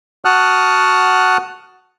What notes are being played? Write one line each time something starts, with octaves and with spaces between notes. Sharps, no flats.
F#4 F#5 A5 D#6 F6 F#6